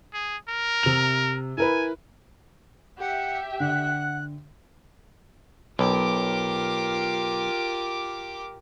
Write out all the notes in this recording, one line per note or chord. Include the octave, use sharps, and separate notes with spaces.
G#4
A#4
C3 F7
E4 A#4 B4 G#5
G4 E5 F#5
D3 F#5 F#6
B1 F4 G4 A#4 D6